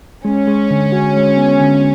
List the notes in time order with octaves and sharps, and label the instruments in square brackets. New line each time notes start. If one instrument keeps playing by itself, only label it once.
[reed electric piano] G#3 [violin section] C#4
[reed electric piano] G#3
D3
F#4
G#3
B3
D3